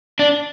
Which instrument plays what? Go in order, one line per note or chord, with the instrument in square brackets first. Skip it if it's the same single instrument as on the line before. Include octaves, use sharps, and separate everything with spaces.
[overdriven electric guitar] D4